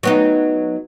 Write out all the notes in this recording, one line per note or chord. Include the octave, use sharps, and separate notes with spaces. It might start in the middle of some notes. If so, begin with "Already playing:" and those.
F#3 B3 D#4